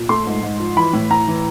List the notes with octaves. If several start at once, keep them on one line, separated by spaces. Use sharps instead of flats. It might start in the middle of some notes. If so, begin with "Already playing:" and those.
Already playing: A#2
A3 C6
G#2
G#2
F3
E3 B5
A2
A2 A#5
E3